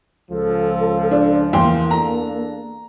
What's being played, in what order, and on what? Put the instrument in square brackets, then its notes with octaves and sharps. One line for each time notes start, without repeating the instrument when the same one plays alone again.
[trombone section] C#2 F3 [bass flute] A4
[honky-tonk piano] D4
[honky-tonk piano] E2 G5 C6 [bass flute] A#3
[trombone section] E2 D4 A4 [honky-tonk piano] A#5